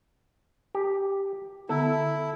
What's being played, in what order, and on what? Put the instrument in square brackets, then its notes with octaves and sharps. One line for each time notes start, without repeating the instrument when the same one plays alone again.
[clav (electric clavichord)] G4
[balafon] D3 B3 [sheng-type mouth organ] E4 [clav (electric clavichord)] A4